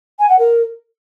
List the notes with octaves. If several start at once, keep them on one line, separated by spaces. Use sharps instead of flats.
G#5
F#5
A#4